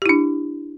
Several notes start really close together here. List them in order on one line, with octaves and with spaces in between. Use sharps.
G4 E4 D4